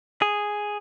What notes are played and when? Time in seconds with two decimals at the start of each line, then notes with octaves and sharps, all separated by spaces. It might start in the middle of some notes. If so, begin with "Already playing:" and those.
0.22 G#4